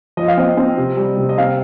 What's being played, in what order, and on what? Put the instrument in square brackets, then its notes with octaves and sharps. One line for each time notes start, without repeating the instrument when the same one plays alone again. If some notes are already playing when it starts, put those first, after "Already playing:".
[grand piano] F3 D#5
F5
C4 D#5
C4
C3
G3
C3
D#5
C4 F5